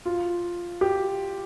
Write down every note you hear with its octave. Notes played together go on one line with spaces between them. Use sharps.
F4
G4